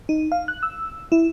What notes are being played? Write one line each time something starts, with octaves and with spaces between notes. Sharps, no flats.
D#4
F5
F#6
E6
E4